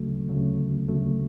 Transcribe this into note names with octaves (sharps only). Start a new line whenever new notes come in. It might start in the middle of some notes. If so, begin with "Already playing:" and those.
Already playing: D2 C#3 F#3 A3
D2 C#3 F#3 A3
D2 C#3 F#3 A3